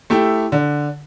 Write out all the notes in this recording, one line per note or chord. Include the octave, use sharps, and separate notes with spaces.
A3 E4 G4
D3